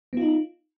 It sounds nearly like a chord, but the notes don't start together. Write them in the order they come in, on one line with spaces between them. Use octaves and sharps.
B3 F4 D#4